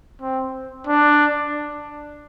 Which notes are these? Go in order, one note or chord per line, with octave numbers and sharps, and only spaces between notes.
C4
D4